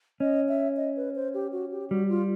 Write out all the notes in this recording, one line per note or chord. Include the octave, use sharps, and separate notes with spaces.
C#4 D#5
E5
D#5
B4
C5
G4
F#4
G4
G3 F#4
F4